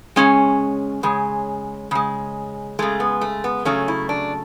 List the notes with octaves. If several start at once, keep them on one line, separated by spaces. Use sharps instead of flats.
C#3 G#3 C#4
C#3 G#3
C#3 G#3
C#3 G#3 A3
B3
A3
B3
C#3 F#3 A3 C#4
E4
D4